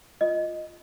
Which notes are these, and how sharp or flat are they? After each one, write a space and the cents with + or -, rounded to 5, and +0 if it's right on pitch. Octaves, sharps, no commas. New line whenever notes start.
F4 +0 D#5 +0